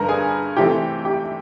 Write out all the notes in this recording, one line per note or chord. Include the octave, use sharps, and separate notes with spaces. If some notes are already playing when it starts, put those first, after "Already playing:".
Already playing: G2 D3 G3 A#4 B4 A#5
G#4 G#5
C3 E3 A3 C4 G4 G5
G4 G5